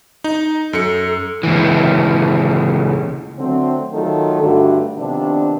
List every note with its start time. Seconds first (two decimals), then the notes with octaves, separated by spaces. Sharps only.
0.24 D#4
0.73 F#2 A4 C#7
1.43 C#2 E3
3.39 D3 F#3 A3 C4
3.93 D#3 F#3 A3 F4 A4
4.40 G2 D3 A3 D4 F#4
4.97 C3 D#3 F3 B3 D4